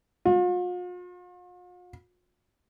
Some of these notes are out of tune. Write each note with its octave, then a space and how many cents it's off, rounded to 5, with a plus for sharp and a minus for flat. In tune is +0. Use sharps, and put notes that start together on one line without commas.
F4 +45